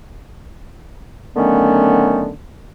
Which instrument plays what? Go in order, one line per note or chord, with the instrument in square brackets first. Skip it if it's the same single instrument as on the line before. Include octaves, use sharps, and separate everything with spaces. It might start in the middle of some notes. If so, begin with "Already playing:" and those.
[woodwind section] D3 D#3 F#3 A3 B3 C#4